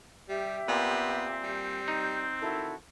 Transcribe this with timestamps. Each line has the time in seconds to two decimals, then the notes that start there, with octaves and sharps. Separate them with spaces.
0.29 G3 G4 E5
0.68 A#2 B3 C4
1.43 G3
1.88 D#4 G6
2.41 D#3 E4 F#4 A4